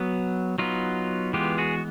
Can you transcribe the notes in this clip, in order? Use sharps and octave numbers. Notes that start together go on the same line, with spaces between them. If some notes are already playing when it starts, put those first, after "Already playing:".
Already playing: F#3 B3
F#3 B3 D#4 F4
E3 G#3 B3 F4 G4
F#4 G#4